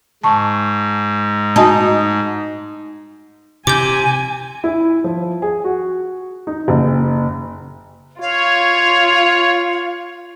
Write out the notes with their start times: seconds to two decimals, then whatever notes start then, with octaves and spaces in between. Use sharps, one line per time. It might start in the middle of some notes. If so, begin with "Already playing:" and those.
0.24 G#2 A5 C#6
1.56 D#4 F#4 G#5 A5
3.67 C3 G#5 D6 G6
4.64 E4
5.04 F3
5.42 G#4
5.64 F#4
6.47 D#4
6.68 F#1
8.21 F4 C#5 F5